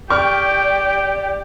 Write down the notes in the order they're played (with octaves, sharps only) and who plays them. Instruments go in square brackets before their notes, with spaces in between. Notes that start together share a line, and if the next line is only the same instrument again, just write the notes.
[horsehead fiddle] G4 [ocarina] D5 [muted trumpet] G5 [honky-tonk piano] C#6 F6